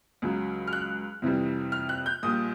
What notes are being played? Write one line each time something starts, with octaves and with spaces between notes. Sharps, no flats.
C#2 C#3 F#3
F6
F#6
F2 C3 E3 G3
F6
F#6
G6
A#1 A#2 G3 D#6